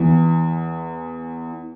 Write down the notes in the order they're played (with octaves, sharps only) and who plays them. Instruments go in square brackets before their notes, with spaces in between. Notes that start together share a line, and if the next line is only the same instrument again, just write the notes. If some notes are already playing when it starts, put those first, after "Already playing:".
Already playing: [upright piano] E2 E3